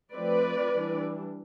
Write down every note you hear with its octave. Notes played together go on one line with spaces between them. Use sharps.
F3 A3 C4 B4 D5
E3 G3 D4